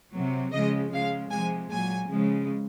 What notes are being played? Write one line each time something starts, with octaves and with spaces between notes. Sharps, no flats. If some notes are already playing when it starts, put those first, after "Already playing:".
C3 F#3
C#3 F3 G#3 D#5
C#3 G#3 F5
C3 F3 G#3 G#5
A#2 F#3 G#5
C#3 F3 G#3